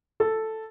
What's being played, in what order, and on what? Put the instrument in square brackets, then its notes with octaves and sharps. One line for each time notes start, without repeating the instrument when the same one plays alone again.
[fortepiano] A4